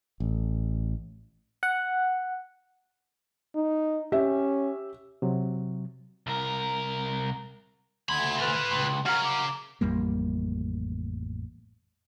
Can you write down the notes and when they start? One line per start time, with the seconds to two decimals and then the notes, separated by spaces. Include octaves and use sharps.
0.20 A1
1.63 F#5
3.55 D#4
4.12 C#4 G4 E5
5.22 C3 F#3
6.27 C2 A#4
8.09 D2 C#3 B5 G#6
8.39 F4 B4 D5
8.71 C#2
9.06 C#3 F#4 A#4 F6
9.24 D6
9.81 A1 F2 G3 A#3